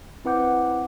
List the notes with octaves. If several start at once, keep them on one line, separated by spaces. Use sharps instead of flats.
C4 E4 B4 F#5 D6 G6